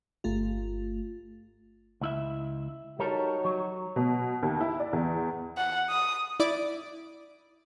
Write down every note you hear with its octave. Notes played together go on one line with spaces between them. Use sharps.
G1 A3 F4
C#2 E4 E5
G3 D#4 F#4 A4 A#4 C#5
F#3
B2
D#2
E4
D5
E2
F#5
D#6
E4 D5 D6